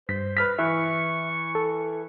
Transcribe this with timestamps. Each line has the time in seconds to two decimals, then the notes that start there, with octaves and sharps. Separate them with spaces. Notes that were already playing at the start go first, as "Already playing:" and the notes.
0.09 G2 C5 B6
0.37 B4 F6 B6
0.58 E3 E5 C#6
1.55 A4